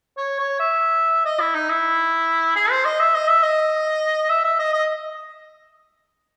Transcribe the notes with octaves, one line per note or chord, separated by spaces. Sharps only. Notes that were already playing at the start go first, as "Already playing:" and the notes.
C#5
C#5
E5
D#5
E4
D#4
E4
G#4
C5
D#5
E5
D#5
E5
D#5
E5
E5
D#5
D#5